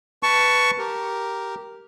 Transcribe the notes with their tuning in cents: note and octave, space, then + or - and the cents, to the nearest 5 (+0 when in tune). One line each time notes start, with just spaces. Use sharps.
B4 +0 A5 +0 C#6 +10
G4 -10 A#4 +0